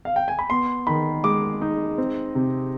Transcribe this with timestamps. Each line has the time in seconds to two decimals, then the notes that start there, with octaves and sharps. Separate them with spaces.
0.05 F5
0.16 G5
0.28 G#5
0.39 B5
0.50 B3 C6
0.87 D#3 B5
1.24 G#3 D6
1.62 D#4
1.98 C4
2.35 C3